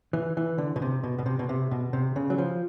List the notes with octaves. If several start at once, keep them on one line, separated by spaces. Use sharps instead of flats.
E3
E3
D3
B2
C3
B2
B2
C3
B2
C3
B2
C3
C#3
F#3
F3